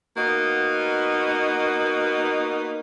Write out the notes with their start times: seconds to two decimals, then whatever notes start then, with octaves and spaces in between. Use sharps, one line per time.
0.16 A#3 B3 D#4 F#4